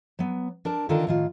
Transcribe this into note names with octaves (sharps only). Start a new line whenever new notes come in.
F#3 B3
D4 A#4 A5
D3 D#3 D4 F4 A4 A#4
A2 D#3 F4